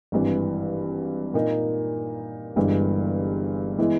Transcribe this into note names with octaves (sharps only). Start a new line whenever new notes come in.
G#1 G2 E3
A#2 A#3 D#4
G1 G2 E3 G#3
E3 G#3 B3 E4